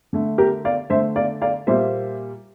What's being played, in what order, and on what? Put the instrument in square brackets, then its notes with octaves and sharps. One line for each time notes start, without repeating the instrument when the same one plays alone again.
[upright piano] D3 A3
G4 A#4
D5 F5
D3 A3 C5 E5
D5 F5
D5 F5
A#2 G3 A#3 C5 E5